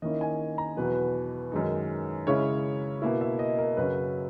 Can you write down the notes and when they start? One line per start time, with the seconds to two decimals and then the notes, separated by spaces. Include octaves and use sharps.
0.02 D#3 A#3 C#4 E4 D#5
0.21 G#5
0.58 A#5
0.77 E2 B2 F#3 B4
1.52 F#2 D#3 G#3 D#4
2.27 C#3 G#3 C#4 E4 C#5
3.02 B2 A#3 E4
3.21 E5
3.39 D#5
3.58 A#4
3.77 F#2 C#3 F#3 C#4 B4